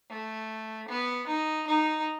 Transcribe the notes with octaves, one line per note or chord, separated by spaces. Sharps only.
A3
B3
D#4
D#4